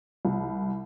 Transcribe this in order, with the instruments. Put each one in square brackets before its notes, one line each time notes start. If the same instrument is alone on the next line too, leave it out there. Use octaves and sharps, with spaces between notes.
[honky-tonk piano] C2